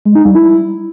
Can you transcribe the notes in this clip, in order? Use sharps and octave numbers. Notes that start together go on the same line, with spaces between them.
G#3
D#4
G3
E4